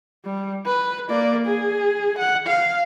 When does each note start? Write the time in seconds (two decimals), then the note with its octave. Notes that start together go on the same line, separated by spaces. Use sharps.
0.25 G3
0.66 B4
1.09 A#3 D5
1.46 G#4
2.18 F#5
2.47 F5